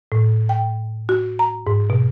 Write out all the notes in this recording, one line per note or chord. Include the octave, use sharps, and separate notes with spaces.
A2
G5
F#4
A#5
G#2
B2